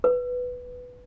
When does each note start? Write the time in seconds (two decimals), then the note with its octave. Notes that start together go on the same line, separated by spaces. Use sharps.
0.04 B4